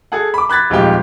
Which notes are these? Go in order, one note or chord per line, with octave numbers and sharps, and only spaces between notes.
G#4 A4 F#5
B5 D6
B5 F#6 G#6 A6 B6
D#1 F2 G#3 F4 G4 G6